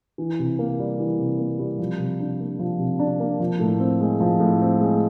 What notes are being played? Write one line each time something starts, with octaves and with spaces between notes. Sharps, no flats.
E3
C3
A#3
G3
E3
C3
A#3
G3
F3
C3
D4
A#3
F3
C3
D4
A#3
F3
A2
C4
G#3
F3
A2
C4
G#3